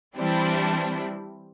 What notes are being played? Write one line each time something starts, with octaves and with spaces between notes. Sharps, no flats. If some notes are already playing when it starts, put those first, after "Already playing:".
E3 G3 C4 D4 E4